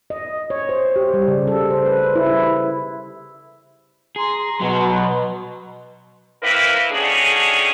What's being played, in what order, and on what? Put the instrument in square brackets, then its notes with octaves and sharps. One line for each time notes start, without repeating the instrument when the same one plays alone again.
[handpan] D#5
C#5
C5
G4
G3
C#3
A4
C5
B4
E4
[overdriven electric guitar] G#4 [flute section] A#5 C6
[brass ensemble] B2 [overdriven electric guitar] F#3
[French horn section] A#3 C4 E4 A#4 B4
D2 D#3 C#4 D4 G#4